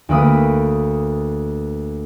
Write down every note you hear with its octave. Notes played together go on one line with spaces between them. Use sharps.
D2 A#3 B4 D#6 B6